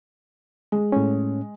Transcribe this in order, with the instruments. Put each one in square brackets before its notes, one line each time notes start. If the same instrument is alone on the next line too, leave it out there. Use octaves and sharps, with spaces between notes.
[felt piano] G#3
[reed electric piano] A2 C#4